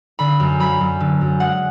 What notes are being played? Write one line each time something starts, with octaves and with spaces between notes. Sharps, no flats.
D3 B5
F#2
F#3 B5
F#2
D3
F#2
G#3 F#5